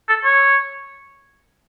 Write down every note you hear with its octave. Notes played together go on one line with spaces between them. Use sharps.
A4
C#5